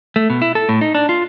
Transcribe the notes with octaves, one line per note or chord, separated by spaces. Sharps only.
A3
B2
E4
A4
A2
D#4
D4
F4